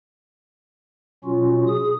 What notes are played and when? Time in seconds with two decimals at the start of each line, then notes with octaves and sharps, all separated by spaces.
1.24 B2 F#3 C#4 F4 F#4
1.67 G#4 D#6